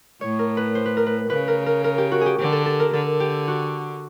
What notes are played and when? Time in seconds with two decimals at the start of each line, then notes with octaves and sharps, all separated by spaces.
0.21 A2 C#5
0.39 A#4
0.57 B4
0.75 C5
0.86 B4
0.97 A#4
1.07 B4
1.30 C#3 B4
1.48 A#4
1.66 A#4
1.84 A#4
1.98 G4
2.12 F#4
2.21 G4 G#4
2.38 D3 G4
2.52 A4
2.66 A4
2.80 A#4
2.93 D3 A4
3.20 G4
3.48 F#4